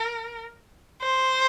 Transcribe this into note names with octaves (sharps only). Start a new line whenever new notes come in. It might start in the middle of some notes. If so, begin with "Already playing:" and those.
Already playing: A#4
C5